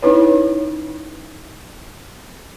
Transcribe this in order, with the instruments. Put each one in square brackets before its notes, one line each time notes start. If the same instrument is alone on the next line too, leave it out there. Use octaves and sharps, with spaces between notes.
[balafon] C#4 D#4 E4 B4 C#5